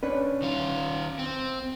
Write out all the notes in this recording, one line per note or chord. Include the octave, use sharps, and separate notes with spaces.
C#4 D4 B4
D#3 F4
C4